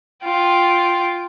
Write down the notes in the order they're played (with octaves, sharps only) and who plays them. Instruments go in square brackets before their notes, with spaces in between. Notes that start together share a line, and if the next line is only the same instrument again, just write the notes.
[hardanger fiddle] F4 G5